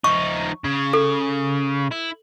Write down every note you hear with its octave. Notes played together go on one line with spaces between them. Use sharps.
F3 D#4 C#6
C#3
A4
E4